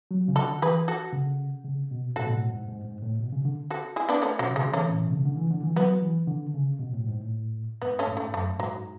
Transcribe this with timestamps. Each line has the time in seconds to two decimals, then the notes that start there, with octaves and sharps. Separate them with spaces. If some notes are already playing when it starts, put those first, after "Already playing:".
0.11 F#3
0.28 C#3
0.36 D3 F#4 A4
0.62 E3 G#4 B4
0.88 F#4 A4
1.13 C#3
1.65 C#3
1.91 B2
2.16 A2 F#4 A4
2.27 B2
2.33 A2
2.50 G#2
2.68 G#2
2.85 G#2
3.02 A2
3.20 B2
3.32 C#3
3.45 D3
3.70 F#4 A4
3.96 E4 G#4
4.09 B3 D4
4.22 A3 C#4
4.39 B2 F#3
4.51 C#3
4.56 G#3
4.62 D3
4.73 E3 A3 C#4
4.90 A2
5.01 B2
5.12 C#3
5.25 D3
5.37 E3
5.51 D3
5.63 E3
5.76 F#3 B3
6.02 E3
6.27 D3
6.54 C#3
6.79 B2
6.93 A2
7.06 G#2
7.20 A2
7.82 G#2 B3
7.99 A3 C#4
8.07 G#2
8.17 A3
8.33 F#2 A3
8.59 G#2 F#3